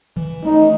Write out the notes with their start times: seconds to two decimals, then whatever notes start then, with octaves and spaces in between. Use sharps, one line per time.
0.17 E3
0.44 A3 D#4